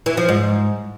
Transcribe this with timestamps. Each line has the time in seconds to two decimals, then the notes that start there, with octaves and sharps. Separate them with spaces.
0.06 E3
0.17 F3
0.29 G#2